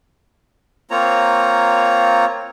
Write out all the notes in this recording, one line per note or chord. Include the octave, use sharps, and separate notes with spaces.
A#3 C4 F4 C#5 A#5